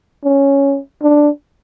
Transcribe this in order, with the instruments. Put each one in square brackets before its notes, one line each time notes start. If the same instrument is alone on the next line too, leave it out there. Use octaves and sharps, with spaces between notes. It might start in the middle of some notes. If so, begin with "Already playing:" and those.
[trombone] C#4
D4